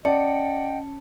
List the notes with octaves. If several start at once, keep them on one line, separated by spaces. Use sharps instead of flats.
C#4 D5 D#5 F#5 G5 A5 C#7